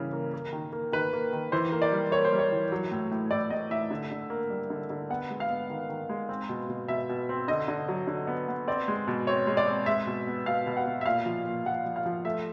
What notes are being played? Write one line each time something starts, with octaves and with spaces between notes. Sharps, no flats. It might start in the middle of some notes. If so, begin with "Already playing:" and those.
Already playing: C#3 E3 G3 A#3
A#3
A#3
D#3
A#3
D#3 B4
A#3
D#3
E3 C5
A#3
D5
G3
A#3 C#5
C5
G3
C#5
E3
F#3
A2
A2
A2 D5
A2 D#5
A2 E5
D3
D3
A#3
G3
D3
D3
B3 F#5
G#3
F5
B3
D#3
D#3
G#3
C4
B2
B2
B2 E5
B2
C4
D3 D#5
D3
F#3
D3
B3
B3
C4 D5
G#3
B2
C4 C#5
G#3
D5
C4
G#3 E5
B2
B3
B2 F5
B2
F#5
B2
E5
A#2 F5
F3
A#2
F3 F#5
F3
F5
F3
A3 E5